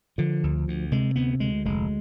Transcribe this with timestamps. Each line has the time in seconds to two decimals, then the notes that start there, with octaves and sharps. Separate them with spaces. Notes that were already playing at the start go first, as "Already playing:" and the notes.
0.18 D3 F3
0.43 D2
0.68 D2
0.92 C3 G#3
1.16 D2 B3
1.40 D2 G#3
1.65 F1 G#3